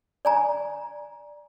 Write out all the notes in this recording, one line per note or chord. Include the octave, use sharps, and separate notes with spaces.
D5 G#5 A#5